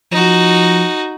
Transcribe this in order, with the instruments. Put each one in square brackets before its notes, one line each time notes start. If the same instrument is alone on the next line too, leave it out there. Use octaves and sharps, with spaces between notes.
[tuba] F3 [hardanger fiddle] D#4 F#4